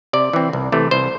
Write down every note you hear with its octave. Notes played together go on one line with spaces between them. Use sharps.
C3 D5
E3 C4
C2
C3 E3 A3
C2 C5